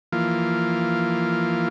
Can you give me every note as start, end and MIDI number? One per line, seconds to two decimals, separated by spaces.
0.12 1.68 52
0.12 1.68 53
0.12 1.68 58
0.12 1.68 65